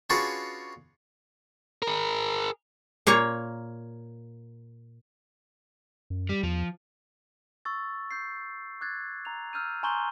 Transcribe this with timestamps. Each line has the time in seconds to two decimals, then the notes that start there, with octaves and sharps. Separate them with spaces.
0.10 C#4 D4 F4 F#4 G#4 B4
1.82 G#4 A#4
3.07 A#2 A#3 C#5 A#5
6.10 F#2
6.29 G3
6.43 E2 F3
7.65 C#6 E6 A6
8.11 G6 C7
8.81 D6 F#6 G#6 A6
9.25 A#5 F7
9.53 E6 F6 G6 D#7
9.83 G#5 A#5 C6 C#6 G6 G7